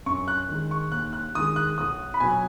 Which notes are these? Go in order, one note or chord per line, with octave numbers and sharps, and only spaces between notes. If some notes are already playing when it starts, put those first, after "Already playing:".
F#2 C#6
F#6
D#3 G#3
C#6
D#2 F#6
F#6
D#3 G#3 D#6
F#6
B1 D#6
B5
B2 F#3 G#5